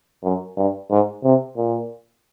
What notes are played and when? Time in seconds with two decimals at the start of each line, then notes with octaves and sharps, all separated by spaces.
0.24 F#2
0.57 G2
0.90 G#2
1.24 C3
1.57 A#2